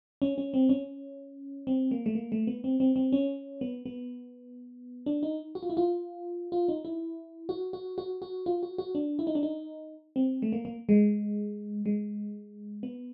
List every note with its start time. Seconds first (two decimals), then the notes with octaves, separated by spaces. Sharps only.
0.22 C#4
0.38 C#4
0.54 C4
0.69 C#4
1.67 C4
1.91 A#3
2.06 A3
2.15 A#3
2.32 A3
2.47 B3
2.64 C4
2.80 C4
2.96 C4
3.12 C#4
3.61 B3
3.85 B3
5.06 D4
5.23 D#4
5.55 F#4
5.63 F4
5.70 E4
5.77 F4
6.52 F4
6.68 D#4
6.85 E4
7.49 F#4
7.73 F#4
7.98 F#4
8.22 F#4
8.46 F4
8.63 F#4
8.78 F#4
8.95 D4
9.19 E4
9.27 D#4
9.35 D4
9.43 D#4
10.16 C4
10.42 A3
10.52 A#3
10.65 A#3
10.89 G#3
11.86 G#3
12.83 B3